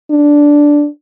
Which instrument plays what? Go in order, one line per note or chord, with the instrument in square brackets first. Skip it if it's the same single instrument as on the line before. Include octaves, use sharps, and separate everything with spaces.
[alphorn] D4